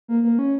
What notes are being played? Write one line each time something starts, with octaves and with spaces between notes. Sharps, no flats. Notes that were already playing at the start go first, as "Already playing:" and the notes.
A#3
A#3
C#4